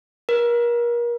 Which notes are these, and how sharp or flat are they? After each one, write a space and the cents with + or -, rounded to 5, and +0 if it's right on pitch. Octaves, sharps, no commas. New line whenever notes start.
A#4 +35